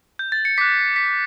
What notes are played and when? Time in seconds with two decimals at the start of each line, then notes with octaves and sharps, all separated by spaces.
0.19 G6
0.32 A6
0.45 C#7
0.58 D6 F#6 B6
0.96 B6